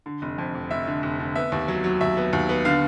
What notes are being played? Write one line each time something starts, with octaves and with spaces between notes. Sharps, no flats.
D3
F1
F2
F1
F1 E5
D3
F1
D3
B3 E5
D#2
F#3
F#3
D#2 E5
B3
D#2
B3
D3 F5